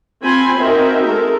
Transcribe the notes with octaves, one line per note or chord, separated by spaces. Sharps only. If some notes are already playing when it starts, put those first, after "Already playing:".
C4 F4 G#5 B5
C4 D#4 F#4 A#4 E5
G#3 A4 A#4